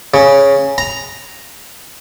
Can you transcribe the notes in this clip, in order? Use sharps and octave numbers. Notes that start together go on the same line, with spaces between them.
C#3
A#5